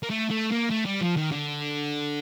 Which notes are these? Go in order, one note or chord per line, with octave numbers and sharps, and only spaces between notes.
A#3
A3
A3
A#3
A3
G3
F3
D#3
D3